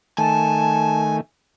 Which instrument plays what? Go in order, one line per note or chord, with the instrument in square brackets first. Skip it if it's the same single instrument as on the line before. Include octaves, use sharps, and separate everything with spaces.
[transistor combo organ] D#3 A3 [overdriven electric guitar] G#5 [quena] A5